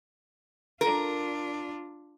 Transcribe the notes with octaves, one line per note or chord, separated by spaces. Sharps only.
D4 F4 A#4